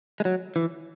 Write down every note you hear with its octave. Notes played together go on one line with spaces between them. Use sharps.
G#3
F#3
E3